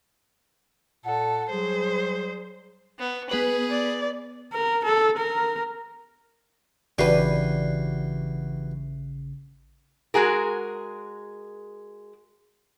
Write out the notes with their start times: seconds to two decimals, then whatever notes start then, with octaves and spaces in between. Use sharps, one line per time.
1.05 A#2 A4 F#5
1.50 F#3 G3 G#4 C5
2.99 B3
3.29 B3 G#4 B4 F#7
3.70 D5
4.53 A#4
4.85 A4
5.18 A#4
6.98 A1 C#3 E3 D4 F#4 G4 B4 C7
10.14 G#3 F#4 G#4 A#4